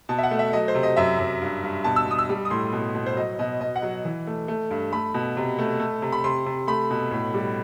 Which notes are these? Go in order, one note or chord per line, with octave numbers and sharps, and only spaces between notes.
B2 A5
E5
F#5
A3
E5
F#3 D#5
C5
C3
D#5
F#2 E5
F#2
G2
G2
B2 A5
E6
B2 D#6
E6
G3
D#6
A2 C6
B2
B2
C5
F#3 D#5
B2 D#5
B2 D#5
F#5
F#3
E3
A3
A3
G2
A3 B5
B2
C3
A3
A3
C3
B5
C3 C6
C3
A3 B5
B2
A2
G3